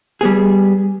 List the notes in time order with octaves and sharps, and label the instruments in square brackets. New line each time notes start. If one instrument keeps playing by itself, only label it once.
[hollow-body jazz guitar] G3 B3 G#4